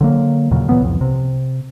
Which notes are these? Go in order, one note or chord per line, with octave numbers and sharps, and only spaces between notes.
D3 F#3 A#3
D#2 A#2 C#3 F#3
A#2 E3 F#3 B3
C2 F2
C3